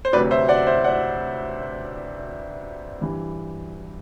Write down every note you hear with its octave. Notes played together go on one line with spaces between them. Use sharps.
C5
D2 C3 F#3 B4 D5
C5 E5
D5 F#5
C5 E5
D5 F#5
G2 E3 G3